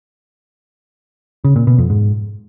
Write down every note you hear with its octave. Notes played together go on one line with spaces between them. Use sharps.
C#3
A#2
B2
F2
G#2